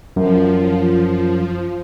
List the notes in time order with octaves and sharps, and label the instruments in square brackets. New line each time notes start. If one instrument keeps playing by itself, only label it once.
[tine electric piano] F#2 [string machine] F3